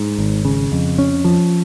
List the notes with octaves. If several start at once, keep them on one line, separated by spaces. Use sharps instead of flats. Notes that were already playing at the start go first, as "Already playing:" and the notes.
Already playing: G#2
G#1
C#3
F2
C#4
F3